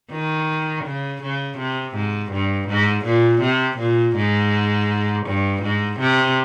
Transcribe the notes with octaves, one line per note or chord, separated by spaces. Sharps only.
D#3
C#3
C#3
C3
G#2
G2
G#2
A#2
C3
A#2
G#2
G2
G#2
C3